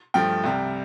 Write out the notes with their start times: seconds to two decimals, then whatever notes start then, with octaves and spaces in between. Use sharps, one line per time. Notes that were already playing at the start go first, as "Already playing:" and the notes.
0.14 G2 F3 A3 G5
0.44 C2 C3 G3